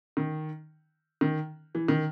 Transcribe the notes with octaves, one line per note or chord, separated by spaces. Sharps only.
D#3
D#3
E3
D#3